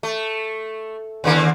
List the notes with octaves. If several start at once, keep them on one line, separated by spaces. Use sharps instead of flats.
A3
D#2 D3 A#3